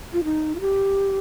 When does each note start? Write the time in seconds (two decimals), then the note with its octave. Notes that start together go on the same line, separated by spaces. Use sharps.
0.13 F4
0.24 D#4
0.55 F4
0.61 G4